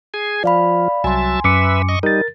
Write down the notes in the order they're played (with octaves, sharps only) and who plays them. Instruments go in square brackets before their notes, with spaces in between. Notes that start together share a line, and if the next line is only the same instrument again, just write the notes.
[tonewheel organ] G#4 G#5
[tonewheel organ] F3 [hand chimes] D5 F5 B5
[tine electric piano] C2 [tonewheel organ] F#3 E5 A5 [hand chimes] G#5 C6
[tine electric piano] F#2 D6 C#7 [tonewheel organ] B4 E5
[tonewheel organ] D#5 C#6
[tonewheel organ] G3 D#4 [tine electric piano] A#4 A6